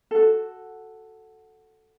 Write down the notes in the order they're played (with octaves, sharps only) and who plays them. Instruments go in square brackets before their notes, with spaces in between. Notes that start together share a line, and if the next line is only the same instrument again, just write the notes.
[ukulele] F#4 A4